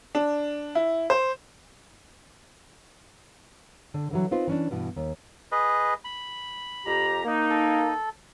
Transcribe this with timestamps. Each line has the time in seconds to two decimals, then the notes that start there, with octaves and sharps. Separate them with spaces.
0.15 D4
0.75 E4
1.10 C5
3.94 D3
4.11 D3 E3 F#3
4.31 C4 D#4 F4 B4 C5
4.48 E3 C#4 D4
4.71 G2 B2 E3
4.96 D#2
5.52 G#4 B4 D#5
6.05 B5
6.86 F2 G4 A#5
7.25 A#3 D#4
7.50 A4